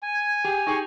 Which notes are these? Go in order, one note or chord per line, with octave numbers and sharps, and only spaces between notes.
G#5
G#6
G4 G#4
D#4 G4 G#4 C#6